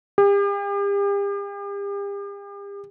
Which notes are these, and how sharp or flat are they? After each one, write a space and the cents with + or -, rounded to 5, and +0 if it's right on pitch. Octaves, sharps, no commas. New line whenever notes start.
G4 +40